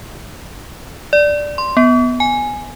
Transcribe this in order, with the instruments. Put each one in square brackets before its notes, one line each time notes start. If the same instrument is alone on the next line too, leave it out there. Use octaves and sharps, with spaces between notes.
[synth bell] D5
C6
B3
G#5